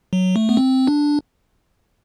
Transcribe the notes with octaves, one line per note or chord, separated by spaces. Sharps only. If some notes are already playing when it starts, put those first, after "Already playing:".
F#3
A3
B3
C4
D4